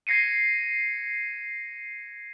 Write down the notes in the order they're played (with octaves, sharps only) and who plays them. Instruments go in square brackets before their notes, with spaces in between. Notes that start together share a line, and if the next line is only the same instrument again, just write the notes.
[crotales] G#6 A#6 C7 C#7 D#7